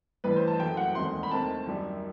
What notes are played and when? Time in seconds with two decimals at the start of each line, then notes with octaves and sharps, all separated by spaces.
0.24 A1 G2 E3 B4
0.36 C5
0.47 A5
0.60 F#1 F#2 F#3 A3 G5
0.77 F#5
0.95 E1 D#2 D#3 A3 C4 C6
1.23 B5
1.31 D#2 D#3 A3 C4 A5
1.67 F#2 D#3 G3